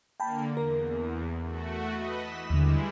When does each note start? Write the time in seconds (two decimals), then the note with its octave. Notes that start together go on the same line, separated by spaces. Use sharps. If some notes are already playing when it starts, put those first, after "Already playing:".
0.20 D3 A#3 G5 A5 B5
0.57 E2 A#4
1.42 A3 F#4
1.91 B4 D#5
2.20 E3 B6 E7
2.50 D#2 D3 G3 G#3 E4